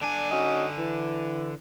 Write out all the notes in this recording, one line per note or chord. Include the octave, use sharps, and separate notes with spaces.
D3 D4 G#5
C#4 D#4 F#4
E3